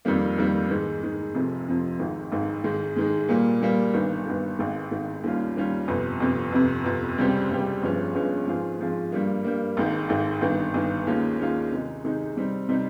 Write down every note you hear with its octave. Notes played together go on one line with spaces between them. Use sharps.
F2 D#3 G3 A#3
F2 D#3 G3 A#3
G#2 D#3 G#3
G#2 D#3 G#3
F1 F2 C3 F3
F1 F2 C3 F3
G#1 G#2 D#3
G#1 G#2 D#3
G#2 D#3 G#3
G#2 D#3 G#3
A#2 G3 A#3
A#2 G3 A#3
G1 G2 D#3
G1 G2 D#3
G#1 G#2 D#3
G#1 G#2 D#3
D#2 D#3 G3 C#4 F4
D#2 D#3 G3 C#4 F4
G1 F2 C3
G1 F2 C3
G1 F2 C3
G1 F2 C3
C#2 C3 G3 C4 G4
C#2 C3 G3 C4 G4
G1 G2 F3 G#3 C#4
G1 G2 F3 G#3 C#4
G#2 F3 C4 F4 G#4
G#2 F3 C4 F4 G#4
G2 G3 A#3
G2 G3 A#3
G#1 G#2 D#3
G#1 G#2 D#3
G1 G2 D#3
G1 G2 D#3
D#2 D#3 G#3 C#4 F4
D#2 D#3 G#3 C#4 F4
C3 D#3 G#3 D#4
C3 D#3 G#3 D#4
C3 G3 C4 D#4
C3 G3 C4 D#4